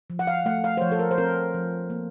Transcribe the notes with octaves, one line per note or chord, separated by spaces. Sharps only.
F3
F#5
F5
A3 F#5
F5
C5
F3 C#5
A4
A#4
C5
C4 A#4
F3
A#3